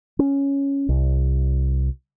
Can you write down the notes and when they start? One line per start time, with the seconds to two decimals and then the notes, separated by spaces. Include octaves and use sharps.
0.19 C#4
0.89 C2